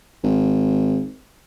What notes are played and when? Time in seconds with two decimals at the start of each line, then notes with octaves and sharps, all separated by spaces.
0.24 G#1